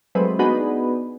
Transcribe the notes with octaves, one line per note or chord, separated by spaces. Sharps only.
F#3 G#3 A3 C4 B4
B3 D4 D#4 F#4 G#4 B4